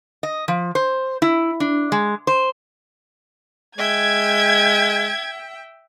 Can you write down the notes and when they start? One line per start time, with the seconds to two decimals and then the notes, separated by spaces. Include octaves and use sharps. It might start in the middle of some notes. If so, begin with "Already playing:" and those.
0.23 D#5
0.48 F3
0.75 C5
1.22 E4
1.60 D4
1.92 G#3
2.27 C5
3.78 G#3 E5 G5 G#6